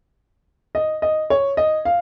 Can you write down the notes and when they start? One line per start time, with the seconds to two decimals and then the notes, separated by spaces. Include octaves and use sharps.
0.75 D#5
1.02 D#5
1.30 C#5
1.57 D#5
1.85 F5